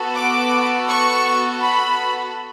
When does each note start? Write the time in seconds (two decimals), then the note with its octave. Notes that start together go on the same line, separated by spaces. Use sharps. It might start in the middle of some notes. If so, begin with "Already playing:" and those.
Already playing: B3 F#4 A4
0.15 D6
0.88 C#6
1.60 B5